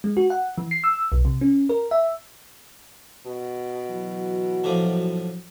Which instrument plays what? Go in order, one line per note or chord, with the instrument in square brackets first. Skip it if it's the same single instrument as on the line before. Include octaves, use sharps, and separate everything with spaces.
[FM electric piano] G#3
F#4
F#5
E3
C7
E6
B1
C3
C#4
A#4
E5
[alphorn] B2
[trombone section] E3 F#3
[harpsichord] A2 D3 F3